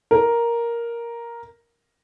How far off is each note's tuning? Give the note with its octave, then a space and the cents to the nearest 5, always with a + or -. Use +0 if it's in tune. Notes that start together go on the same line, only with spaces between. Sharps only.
A#4 +5